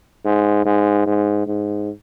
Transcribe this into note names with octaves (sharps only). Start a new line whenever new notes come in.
G#2
G#2
G#2
G#2